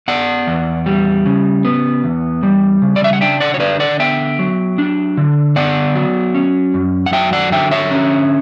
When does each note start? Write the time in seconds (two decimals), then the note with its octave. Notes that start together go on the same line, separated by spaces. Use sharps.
0.08 B3 D5 F#5
0.47 E2
0.86 G3
1.26 C#3
1.65 B3
2.04 E2
2.43 G3
2.82 C#3
2.96 D5
3.04 E5
3.13 F#5
3.21 D4 E5 G5
3.40 D5 F#5
3.54 C#5
3.60 D3 B4 D5
3.80 D5 F#5
3.99 B3 E5 G5
4.39 F#3
4.78 D4
5.17 D3
5.56 B3 D5 F#5
5.95 F#3
6.35 C#4
6.74 F#2
7.06 F#5
7.13 F#3 E5 G5
7.33 D5 F#5
7.52 D3 E5 G5
7.71 C#5 E5
7.91 C#4